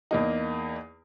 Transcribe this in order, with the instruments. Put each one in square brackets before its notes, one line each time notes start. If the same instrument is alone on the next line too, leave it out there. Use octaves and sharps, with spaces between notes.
[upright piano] E2 A#3 D#4